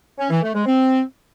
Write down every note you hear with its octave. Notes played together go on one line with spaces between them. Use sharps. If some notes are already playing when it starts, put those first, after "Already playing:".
C#4
E3
A3
G#3
C4